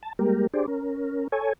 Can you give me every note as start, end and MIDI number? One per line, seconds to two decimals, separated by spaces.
0.03 0.13 81
0.19 0.47 55
0.19 0.47 56
0.19 0.47 58
0.19 0.47 67
0.19 0.47 70
0.54 0.66 62
0.54 0.66 67
0.54 0.66 68
0.54 0.66 72
0.54 0.66 74
0.68 1.28 61
0.68 1.28 70
1.32 1.53 69
1.32 1.53 73
1.32 1.53 80